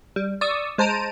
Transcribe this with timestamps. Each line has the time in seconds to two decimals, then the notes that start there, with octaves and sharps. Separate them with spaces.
0.16 G3
0.41 D5 C#6 D#6 E6
0.78 G#3 C5 A5 A#5 D7 D#7